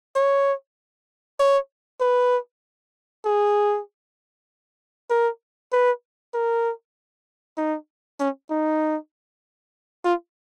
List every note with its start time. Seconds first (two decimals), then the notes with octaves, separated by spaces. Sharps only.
0.16 C#5
1.39 C#5
2.00 B4
3.25 G#4
5.10 A#4
5.72 B4
6.34 A#4
7.57 D#4
8.20 C#4
8.50 D#4
10.04 F4